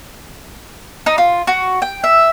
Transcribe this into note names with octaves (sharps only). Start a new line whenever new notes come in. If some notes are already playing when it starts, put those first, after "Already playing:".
D#4
F4
F#4
G5
E5